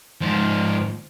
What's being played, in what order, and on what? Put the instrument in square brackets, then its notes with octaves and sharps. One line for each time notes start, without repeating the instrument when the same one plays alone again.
[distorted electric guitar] G#2 F3